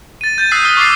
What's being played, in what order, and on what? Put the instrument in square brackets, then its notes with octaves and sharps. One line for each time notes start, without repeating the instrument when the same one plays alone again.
[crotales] A6 D#7
G6 A6 D#7
D#6 E6 F#6 G6 B6 C7
D#6 F6 G7
C#6 D6 A6 C7